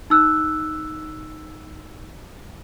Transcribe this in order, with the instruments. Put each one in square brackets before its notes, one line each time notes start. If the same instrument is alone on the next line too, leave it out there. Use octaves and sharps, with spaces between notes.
[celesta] D#4 E6 F#6